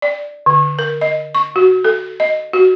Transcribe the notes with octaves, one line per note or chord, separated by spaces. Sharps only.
D5
D3
A#4
D#5
C#6
F#4
A4
D#5
F#4